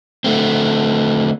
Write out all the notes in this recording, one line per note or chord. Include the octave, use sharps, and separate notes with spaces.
D3 A3 C4